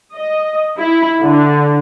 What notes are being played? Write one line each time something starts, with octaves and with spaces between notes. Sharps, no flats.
D#5
E4
D3